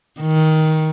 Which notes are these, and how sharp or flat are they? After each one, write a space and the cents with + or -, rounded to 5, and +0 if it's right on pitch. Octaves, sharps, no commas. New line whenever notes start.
D#3 +15